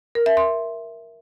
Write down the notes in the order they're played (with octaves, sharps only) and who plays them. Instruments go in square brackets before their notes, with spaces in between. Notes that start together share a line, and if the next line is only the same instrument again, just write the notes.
[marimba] A#4
E5
C6